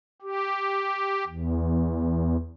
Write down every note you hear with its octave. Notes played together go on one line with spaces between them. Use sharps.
G4
E2